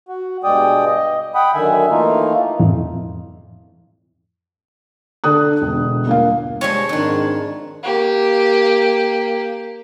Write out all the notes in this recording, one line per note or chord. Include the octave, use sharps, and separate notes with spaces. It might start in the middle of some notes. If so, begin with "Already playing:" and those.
F#4
G2 B2 G#3 D5 G5 D#6
D#5
F#5 G5 B5 D#6
F#2 D3 D#3 E5 G#5
E3 A3 A#3 D#4 F4
F2 A2 E3
D3 A4 D#6 F#6
E1
G1 A#3 F5
G2 F3 G#3 C#5
F2 G#2 D#3 D4
A#3 G4